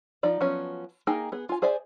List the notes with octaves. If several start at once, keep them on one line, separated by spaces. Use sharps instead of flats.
F3 D#4 D5
F3 F#3 B3 C#4
A#3 D#4 G#4 G5
B3 G#4
F4 G#5
G#4 C5 D5 E5 G#5